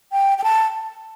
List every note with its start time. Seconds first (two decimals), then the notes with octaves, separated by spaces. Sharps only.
0.12 G5
0.38 G5
0.44 A5